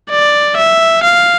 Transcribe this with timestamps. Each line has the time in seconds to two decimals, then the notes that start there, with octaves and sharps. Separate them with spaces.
0.11 D5
0.57 E5
1.03 F5